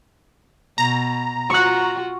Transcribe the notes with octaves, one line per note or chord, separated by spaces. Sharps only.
B2 A#5
F4 F#4 C#6 F#6